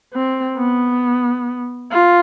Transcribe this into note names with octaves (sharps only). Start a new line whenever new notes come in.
C4
B3
F4